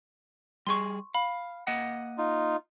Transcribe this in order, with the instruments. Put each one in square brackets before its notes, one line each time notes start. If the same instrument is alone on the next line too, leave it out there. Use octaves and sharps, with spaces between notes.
[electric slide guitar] G3 G#4 [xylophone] C6 C#6
[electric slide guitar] F5 [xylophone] B5
[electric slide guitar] A#3 D#5 F#5
[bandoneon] D#4 F4